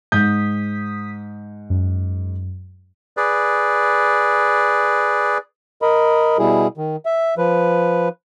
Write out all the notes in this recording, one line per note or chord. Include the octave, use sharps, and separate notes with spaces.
G#2 D#6 G6 B6
F#2
G#4 B4 D5
A#4 D#5 B5
B2 G3 E4 G#4
D#3
E5
F3 B4